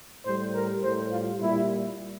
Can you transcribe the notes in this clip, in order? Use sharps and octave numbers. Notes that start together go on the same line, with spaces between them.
A2 G3 C5
A#4
A2 G3 C5
F4
A#2 G3 E4